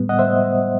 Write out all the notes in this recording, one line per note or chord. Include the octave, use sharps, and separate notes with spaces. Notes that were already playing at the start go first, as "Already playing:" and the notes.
Already playing: A2 G3 B3
D#5 F#5
C5 E5